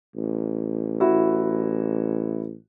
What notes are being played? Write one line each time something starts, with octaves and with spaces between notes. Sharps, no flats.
A1
E4 F#4